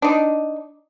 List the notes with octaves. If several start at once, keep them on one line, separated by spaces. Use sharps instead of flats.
D4 D#4